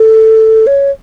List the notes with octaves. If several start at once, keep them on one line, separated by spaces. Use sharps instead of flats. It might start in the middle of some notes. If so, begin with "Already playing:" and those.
Already playing: A4
C#5